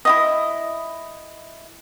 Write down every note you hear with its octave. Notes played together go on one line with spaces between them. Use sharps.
E4 F4 D#5